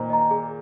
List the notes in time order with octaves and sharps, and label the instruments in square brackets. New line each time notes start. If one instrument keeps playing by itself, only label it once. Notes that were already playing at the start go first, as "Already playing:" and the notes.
Already playing: [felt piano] A#2 D#3 [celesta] C5 D#5 A#5
[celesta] D#5 A#5
G#4